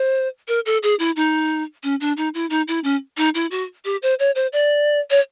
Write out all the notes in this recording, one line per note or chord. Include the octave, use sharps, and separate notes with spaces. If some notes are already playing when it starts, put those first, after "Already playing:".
Already playing: C5
A#4
A4
G#4
E4
D#4
C#4
D4
D#4
E4
D#4
E4
C#4
D#4
E4
F#4
G4
C5
C#5
C5
D5
C#5